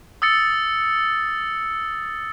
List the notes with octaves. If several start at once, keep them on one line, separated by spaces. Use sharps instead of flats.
D#6 E6 A6 C#7